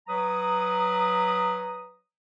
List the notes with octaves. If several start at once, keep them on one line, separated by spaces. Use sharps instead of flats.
F#3 B4 A#5 D#6